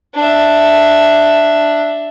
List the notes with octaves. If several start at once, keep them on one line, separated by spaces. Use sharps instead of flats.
D4 E5